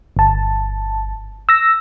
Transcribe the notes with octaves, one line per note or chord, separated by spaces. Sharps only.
G1 A5
E6 A#6